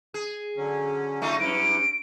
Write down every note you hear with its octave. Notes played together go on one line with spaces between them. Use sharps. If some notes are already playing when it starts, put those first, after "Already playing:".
G#4
D3 F#3 C#4
A3 D#4 F4
G2 F#3 C#4 E4 D7